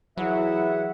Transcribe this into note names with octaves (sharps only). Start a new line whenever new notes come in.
E3 F#3 E4 G#4 E5 F#5